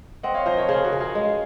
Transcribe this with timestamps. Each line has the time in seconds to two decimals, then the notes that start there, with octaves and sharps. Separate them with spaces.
0.23 C4 D#5 F#5
0.34 C#5 F5
0.46 F3 C5 D#5
0.58 A#4 C#5
0.69 C#3 G#4 C5
0.84 F#4 A#4
0.93 C#3
1.00 F4 G#4
1.15 G#3